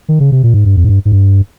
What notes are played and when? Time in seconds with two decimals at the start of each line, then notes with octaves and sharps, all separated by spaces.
0.09 D#3
0.20 C#3
0.32 C3
0.43 A#2
0.54 G#2
0.66 G2
0.77 F2
0.84 G#2
0.89 G2
1.05 G#2
1.12 G2